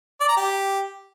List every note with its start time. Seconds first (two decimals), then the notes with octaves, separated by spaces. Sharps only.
0.21 D5
0.29 A#5
0.37 G4